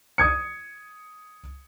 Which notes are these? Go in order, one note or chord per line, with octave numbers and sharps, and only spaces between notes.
D#6 G#6 C#7